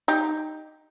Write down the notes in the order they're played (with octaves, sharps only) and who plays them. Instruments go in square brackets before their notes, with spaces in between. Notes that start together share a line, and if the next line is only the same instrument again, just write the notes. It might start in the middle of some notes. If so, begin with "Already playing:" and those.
[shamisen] D#4 G4